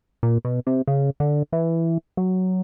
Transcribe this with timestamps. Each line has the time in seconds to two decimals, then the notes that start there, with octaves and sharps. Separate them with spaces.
0.23 A#2
0.45 B2
0.67 C3
0.88 C#3
1.20 D3
1.52 E3
2.17 F#3